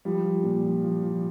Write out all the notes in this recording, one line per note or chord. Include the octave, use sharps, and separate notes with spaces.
F3 G3
F3
A#2
F3
F3
F3